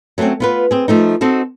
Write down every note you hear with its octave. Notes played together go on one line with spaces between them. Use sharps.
F#3 A3 A#3 C4 C#4
B3 F4 B4
C4 G#4
F3 A3 D#4
C4 D#4 F#4 A4